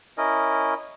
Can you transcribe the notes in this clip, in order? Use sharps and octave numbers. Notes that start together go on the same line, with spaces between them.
C#4 E4 A#4 D#5